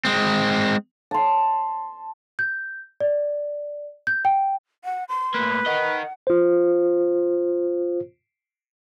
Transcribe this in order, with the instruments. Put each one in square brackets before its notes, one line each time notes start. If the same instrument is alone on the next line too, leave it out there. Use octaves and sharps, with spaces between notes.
[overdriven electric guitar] G#3 C4
[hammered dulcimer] A5 C6
[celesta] G6
D5
G6
G5
[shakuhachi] F#5
C6
[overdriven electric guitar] A2 A#3 [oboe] B4
[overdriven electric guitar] A#4 D#5 [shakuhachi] F#5
[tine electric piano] F4 C5